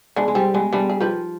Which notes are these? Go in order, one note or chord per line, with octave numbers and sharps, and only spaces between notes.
G#3 B3 D4
G#3
G3 C4
G#3 B3
G3 B3 D4
G#4
F3 G4 B4